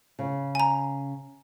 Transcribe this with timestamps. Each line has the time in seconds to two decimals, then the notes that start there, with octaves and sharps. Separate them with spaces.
0.19 C#3
0.55 G#5 A#5